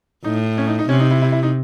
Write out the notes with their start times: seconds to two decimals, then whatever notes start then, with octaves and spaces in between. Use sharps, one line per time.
0.24 A2 D#4
0.58 C#4
0.67 D#4
0.79 D#4
0.89 C3 C#4
1.00 D#4
1.11 E4
1.22 E4
1.32 E4
1.43 D#4